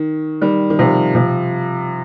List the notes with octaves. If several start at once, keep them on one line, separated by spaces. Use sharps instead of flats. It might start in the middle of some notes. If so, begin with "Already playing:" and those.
Already playing: D#3
D#3 G3
D#3
C3 F3
C3 F3